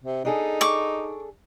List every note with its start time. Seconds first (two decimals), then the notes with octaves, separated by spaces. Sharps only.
0.03 C3
0.25 D4 D#4 G#4 A4
0.61 C#6 D6